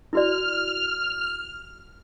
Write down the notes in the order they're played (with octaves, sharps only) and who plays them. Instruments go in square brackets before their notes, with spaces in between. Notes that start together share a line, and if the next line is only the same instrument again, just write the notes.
[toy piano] E4 F#4 D5 [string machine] F6